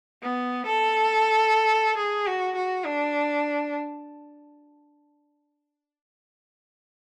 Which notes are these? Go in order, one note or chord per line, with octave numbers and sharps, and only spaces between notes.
B3
A4
G#4
F#4
F#4
D4